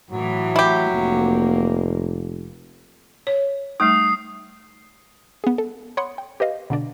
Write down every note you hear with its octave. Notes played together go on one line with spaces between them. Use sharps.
A2 E3 F#3
E4 G4
F1 A#3
C#5
G3 A3 D#4 D#6 C7
B3 G#4
A4
C#5 F#5 B5 C6 D#6 C#7
G5
G4 B4 D#5 F5
B2 D3 D4 D5